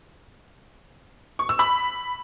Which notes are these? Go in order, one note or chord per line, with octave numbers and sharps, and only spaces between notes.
C#6
E6
B5